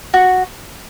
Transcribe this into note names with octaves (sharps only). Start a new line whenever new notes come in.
F#4